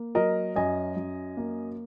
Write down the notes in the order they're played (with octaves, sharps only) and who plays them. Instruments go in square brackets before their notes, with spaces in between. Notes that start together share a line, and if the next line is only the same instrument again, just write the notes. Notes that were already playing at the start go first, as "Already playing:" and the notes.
Already playing: [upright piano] A#3
F#3 A#4 D#5
F#2 D#5 G#5
F#2
A#3